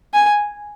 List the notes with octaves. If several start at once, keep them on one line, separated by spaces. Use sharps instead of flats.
G#5